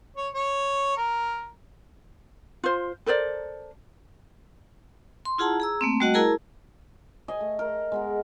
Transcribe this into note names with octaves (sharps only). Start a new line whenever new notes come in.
C#5
C#5
A#4
F4 C5
A4 A#4 C5 D5
C6
E4 F4 G#4 F#5 A5 A#5
G#4 A#5 E6
A3 A#3 C4
G3 A3 F#4 D#5 F#5
E4 G#4 A#4 A5 A#5
D#5 G#5
A3
A#4
G#3 B3 A#4